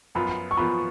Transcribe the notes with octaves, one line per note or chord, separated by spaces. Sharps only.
F#2 F3 B3 F4 B5
C#6
F#2 F3 B3 F4 B5